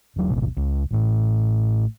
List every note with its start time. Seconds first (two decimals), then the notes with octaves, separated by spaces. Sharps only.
0.16 E1 F#3
0.30 D1 G#1 B2
0.57 C#2
0.91 A1 A2